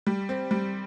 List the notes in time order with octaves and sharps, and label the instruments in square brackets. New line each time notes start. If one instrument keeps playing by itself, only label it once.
[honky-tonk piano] G3
C4
G3